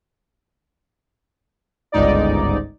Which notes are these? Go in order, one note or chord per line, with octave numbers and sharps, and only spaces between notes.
G1 C#2 G#2 D#4 D5